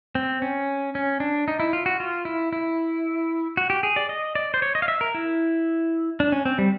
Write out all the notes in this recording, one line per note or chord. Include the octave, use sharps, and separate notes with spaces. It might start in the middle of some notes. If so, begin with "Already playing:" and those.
C4
C#4
C#4
D4
D#4
E4
F4
F#4
F4
E4
E4
F#4
G4
G#4
D5
D#5
D5
C5
C#5
D#5
F5
E5
A#4
E4
D4
C#4
C4
G3